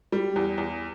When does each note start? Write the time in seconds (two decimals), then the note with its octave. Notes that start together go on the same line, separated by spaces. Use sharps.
0.12 G3
0.36 E2
0.58 E2